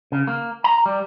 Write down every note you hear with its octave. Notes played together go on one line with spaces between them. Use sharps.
C#3
A#3
A#5
G3